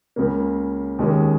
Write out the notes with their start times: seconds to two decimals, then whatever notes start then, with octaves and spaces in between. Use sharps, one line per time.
0.16 C#2 C#3 A#3
0.99 D#2 D#3 G#3 C#4